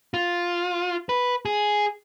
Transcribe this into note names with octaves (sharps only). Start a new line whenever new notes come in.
F4
B4
G#4